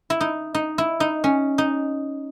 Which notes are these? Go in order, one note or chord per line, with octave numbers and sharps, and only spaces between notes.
E4
D#4
D#4
E4
D#4
C#4
D#4